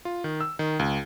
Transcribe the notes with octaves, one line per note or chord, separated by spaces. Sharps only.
F4
D#3
E6
D#3
C#2